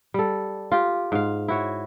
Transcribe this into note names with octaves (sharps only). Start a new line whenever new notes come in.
G3 A4
F4 G4
G#2 F5
E4 F#4 C#5